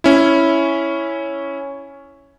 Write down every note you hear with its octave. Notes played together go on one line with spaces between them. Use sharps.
C#4 E4